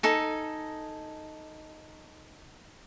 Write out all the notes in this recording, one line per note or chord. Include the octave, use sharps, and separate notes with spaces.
D#4 A4 G#5